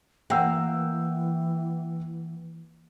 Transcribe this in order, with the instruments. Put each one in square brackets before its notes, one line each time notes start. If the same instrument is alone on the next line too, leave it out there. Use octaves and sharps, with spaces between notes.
[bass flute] E3 [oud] A#3 [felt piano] F#5 G5 E6